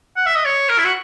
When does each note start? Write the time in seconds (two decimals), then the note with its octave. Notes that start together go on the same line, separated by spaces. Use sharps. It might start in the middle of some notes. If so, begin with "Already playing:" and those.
0.16 F#5
0.26 E5
0.35 D#5
0.45 C#5
0.68 A#4
0.78 E4
0.84 F#4